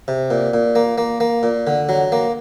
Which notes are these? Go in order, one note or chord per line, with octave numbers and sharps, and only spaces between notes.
C3
A#2
A#2
A#3
A#3
A#3
A#2
D3
F#3
A#3